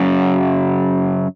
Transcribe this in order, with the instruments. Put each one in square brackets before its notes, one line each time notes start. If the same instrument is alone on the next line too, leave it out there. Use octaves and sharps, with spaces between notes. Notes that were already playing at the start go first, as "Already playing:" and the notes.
Already playing: [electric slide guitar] F#2 C#3 F#3